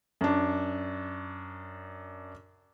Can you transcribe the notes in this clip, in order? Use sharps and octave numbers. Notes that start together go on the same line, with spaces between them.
F#2 D4